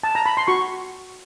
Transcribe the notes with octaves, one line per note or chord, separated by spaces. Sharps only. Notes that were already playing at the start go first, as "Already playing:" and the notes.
A5
A#5
B5
C6
F#4 C#6